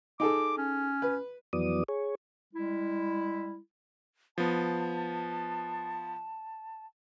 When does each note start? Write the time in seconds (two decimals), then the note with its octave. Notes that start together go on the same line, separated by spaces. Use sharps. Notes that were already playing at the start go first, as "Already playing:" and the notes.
0.20 D#4 G#4 A4 D6
0.58 C#4
1.02 B4
1.53 F2 E3 F#3 B3 D5 D#6
1.88 G#4 C#5
2.53 G3 G#3 E4
4.38 F3 B3 A5